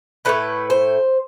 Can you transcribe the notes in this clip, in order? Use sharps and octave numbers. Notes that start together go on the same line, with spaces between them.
A2 E3 A3 E4 B4
C5